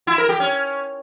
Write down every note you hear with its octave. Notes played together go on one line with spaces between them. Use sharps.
E4
A#4
G4
C#4